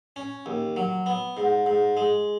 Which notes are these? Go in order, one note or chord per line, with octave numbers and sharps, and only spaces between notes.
C#4
D#2
F#3
B3
G#2
G#2
G#3